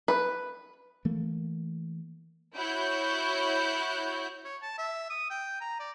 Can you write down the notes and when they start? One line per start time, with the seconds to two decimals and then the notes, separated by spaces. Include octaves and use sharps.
0.08 B4
1.05 E3 A3 A#3
2.56 E4 F#4 C#5 F#6 G6
4.45 C#5
4.62 A5
4.78 E5
5.10 D#6
5.30 G5
5.61 A#5
5.79 D5